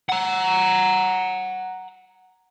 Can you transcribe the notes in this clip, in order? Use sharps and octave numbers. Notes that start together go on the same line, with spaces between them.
F#5 A#5